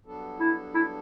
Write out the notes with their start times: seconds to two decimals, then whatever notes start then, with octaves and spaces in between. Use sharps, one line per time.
0.05 G2 F#3 B3 D4 A4
0.40 E4
0.75 E4